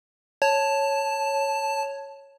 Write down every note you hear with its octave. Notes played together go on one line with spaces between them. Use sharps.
C#5 A5